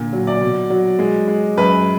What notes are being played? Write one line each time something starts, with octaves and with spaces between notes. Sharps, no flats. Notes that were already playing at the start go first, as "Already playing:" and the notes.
Already playing: A#2 D3
F#3
D5
B2
F#3
G#3
G#3
F#2 B4